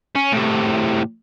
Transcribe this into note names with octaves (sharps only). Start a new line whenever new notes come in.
C#4
A2 C3